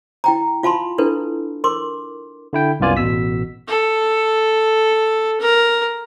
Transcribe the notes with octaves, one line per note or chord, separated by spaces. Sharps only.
E4 G5 A#5
F4 F5 A5 B5 C6
D4 E4 A4 B4
A#4 C6 D6
D3 E4 G5
C2 F#2 B3 F4 D5 G#5
A1 B2 E6 B6
A4
A#4